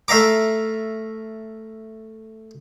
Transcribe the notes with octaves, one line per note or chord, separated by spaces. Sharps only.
A3 E5 F5 A#5 D6